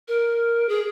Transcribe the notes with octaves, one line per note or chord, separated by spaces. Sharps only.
A#4
G#4